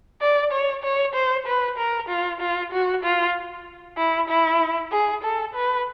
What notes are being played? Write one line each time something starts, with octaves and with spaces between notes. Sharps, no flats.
D5
C#5
C#5
C5
B4
A#4
F4
F4
F#4
F4
E4
E4
G#4
A4
B4